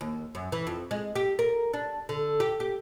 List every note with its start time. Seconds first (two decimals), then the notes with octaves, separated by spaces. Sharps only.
0.01 D#2
0.35 F#2
0.52 E3
0.67 F2
0.91 G#3
1.16 G4
1.39 A#4
1.74 D4
2.09 D3
2.40 G4
2.60 G4